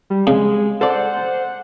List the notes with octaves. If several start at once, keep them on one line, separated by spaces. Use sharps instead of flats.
G3
C#3 G#3 G#4
A4 C5 D5 F#5